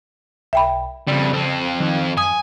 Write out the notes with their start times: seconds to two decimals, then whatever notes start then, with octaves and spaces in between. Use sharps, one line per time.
0.53 B1 E5 G5 B5
1.07 F2 C#3 G3
1.33 F2 C4
1.80 D#3 F3
2.18 F#2 G#5 D#6